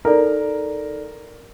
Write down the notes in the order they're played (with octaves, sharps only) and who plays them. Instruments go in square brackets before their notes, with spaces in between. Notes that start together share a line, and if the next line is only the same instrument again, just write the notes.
[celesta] D#4 A4 D5 [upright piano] A#4